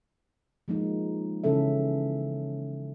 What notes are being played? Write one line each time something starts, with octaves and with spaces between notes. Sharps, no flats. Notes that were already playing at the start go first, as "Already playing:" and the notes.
F3 G#3 A#3 D#4
C#3 E3 C#4 A4 E5